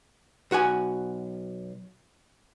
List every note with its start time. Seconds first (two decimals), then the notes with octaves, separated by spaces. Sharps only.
0.51 B1 F#4 F#5 G#5